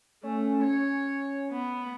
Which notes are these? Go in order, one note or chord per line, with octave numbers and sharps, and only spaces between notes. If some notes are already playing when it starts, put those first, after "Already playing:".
A3 C#4
C#5
B3